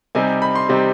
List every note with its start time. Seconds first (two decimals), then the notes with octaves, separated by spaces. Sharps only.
0.15 C3 G3 C4 D#4 G#5
0.42 B5
0.55 C6
0.69 C3 G3 C4 D#4